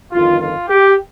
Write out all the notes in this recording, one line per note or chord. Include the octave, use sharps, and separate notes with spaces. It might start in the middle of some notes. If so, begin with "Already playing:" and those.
G1 F2 D#3 F4
F4
G4